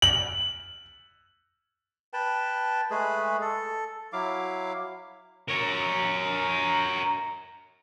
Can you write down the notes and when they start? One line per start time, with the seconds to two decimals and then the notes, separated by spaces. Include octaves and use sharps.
0.02 F#7
2.13 B4 G5 A5
2.91 G#3 A3 G#4 B4
3.41 A4
4.13 F#3 E4 F5 D6
5.49 A#4 C#5